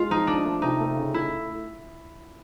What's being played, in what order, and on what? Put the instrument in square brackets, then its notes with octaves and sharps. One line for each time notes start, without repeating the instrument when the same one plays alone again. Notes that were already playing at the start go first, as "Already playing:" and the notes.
Already playing: [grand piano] G#3 [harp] F4
[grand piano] F3 [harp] D#4
[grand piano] F3 [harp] D4
[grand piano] A3
[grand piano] C3 [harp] D#4
[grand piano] A3
C#3
[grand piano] A3 [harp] E4